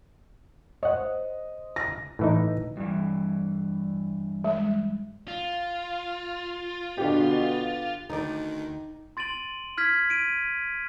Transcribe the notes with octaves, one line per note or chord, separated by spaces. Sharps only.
C5 C#5 D#5 F#5
A#6
A2 E3 D#4
G2 E3
G#3
F4
B2 D3 G4
D2 D#3 D#4 D5
C6 A6 D7 D#7 F#7
F6 G#6 B6
D7 D#7